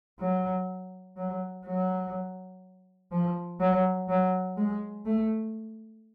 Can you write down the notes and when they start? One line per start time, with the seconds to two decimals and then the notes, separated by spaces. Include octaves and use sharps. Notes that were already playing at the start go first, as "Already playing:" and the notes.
0.19 F#3
1.17 F#3
1.65 F#3
3.12 F3
3.60 F#3
4.09 F#3
4.57 G#3
5.06 A3